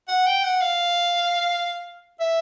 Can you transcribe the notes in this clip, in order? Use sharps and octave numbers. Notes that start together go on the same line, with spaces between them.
F#5
G5
F#5
F5
E5